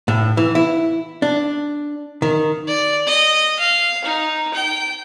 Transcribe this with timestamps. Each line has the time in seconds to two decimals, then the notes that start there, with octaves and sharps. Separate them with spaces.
0.08 A2
0.37 E3
0.55 E4
1.22 D4
2.22 D#3
2.68 D5
3.07 D#5
3.59 F5
4.04 D#4
4.54 G5